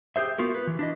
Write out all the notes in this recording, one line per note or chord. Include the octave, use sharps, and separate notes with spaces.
G4 G#4 C5 E5
B3 F4 F#4 A#4
B4
E3
D4 E4 D#5